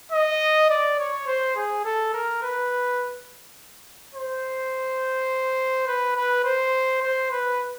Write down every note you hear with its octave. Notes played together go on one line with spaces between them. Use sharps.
D#5
D5
C#5
C5
G#4
A4
A#4
B4
C5
B4
B4
C5
C5
B4